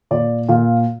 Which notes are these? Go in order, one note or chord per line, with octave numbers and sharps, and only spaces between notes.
A#2 D5
A#2 F5